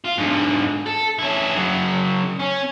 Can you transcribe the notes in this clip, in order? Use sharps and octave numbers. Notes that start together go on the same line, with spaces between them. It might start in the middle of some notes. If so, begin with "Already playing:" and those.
F4
G#2 D3
A4
C#4 E4
C#3 F#3
C#4